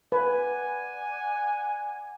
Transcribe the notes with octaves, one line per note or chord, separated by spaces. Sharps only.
B4 D5 F#5 G#5